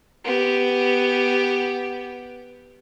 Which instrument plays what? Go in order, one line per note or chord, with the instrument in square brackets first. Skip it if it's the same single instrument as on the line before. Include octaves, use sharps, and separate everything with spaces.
[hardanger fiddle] B3 G4